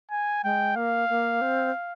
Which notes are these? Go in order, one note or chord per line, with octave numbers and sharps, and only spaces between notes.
G#5
G#3 G5
A#3 F5
A#3
C4